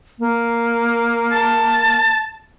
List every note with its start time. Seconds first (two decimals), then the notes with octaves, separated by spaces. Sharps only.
0.19 A#3
1.32 A5